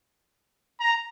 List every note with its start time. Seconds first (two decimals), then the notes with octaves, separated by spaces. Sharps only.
0.80 A#5